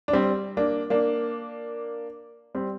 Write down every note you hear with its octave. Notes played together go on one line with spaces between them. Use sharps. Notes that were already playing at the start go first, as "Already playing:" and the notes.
D4
G3 C4
A#3 D4
A#3 D4
G3 C4